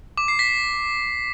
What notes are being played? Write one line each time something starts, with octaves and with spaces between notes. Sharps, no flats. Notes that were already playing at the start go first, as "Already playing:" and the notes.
D6
C7
B6